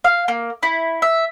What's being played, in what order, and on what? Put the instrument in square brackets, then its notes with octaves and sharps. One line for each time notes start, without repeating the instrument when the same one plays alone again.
[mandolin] F5
A#3
E4
E5